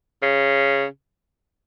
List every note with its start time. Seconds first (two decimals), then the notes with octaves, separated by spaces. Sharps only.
0.23 C#3